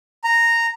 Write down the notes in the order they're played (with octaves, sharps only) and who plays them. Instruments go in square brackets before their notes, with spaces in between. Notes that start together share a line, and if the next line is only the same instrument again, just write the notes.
[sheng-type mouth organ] A#5